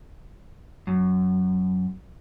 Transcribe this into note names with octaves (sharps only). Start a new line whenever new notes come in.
F#2